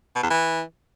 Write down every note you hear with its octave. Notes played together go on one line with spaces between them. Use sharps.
B2
E2
E3